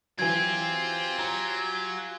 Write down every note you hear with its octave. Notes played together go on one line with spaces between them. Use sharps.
E3 F#3 C4 F4 G4 G#5 G#6
F#3 A#5